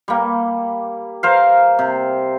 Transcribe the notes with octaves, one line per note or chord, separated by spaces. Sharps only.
G3 A#3
A#4 C5 F5
C3